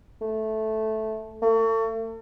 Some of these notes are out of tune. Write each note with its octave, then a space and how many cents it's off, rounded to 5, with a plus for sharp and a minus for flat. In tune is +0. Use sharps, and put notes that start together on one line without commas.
A3 -10
A3 +40